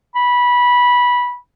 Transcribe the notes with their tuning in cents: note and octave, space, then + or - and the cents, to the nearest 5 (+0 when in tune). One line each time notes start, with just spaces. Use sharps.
B5 -15